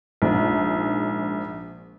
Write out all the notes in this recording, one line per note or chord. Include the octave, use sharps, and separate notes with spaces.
A#1 G#2